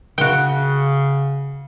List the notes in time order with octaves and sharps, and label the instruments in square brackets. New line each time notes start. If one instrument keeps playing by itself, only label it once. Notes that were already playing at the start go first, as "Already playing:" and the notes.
[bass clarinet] C#3 [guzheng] F#4 G5